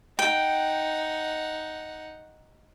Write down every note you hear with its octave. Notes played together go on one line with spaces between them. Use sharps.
D#4 F#5 G5